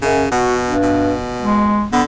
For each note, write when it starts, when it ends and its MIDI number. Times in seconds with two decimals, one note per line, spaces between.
0.02 0.25 42
0.02 0.29 49
0.32 0.76 47
0.32 0.55 66
0.65 1.13 43
0.82 1.81 47
1.40 1.86 56
1.92 2.04 50
1.92 2.01 59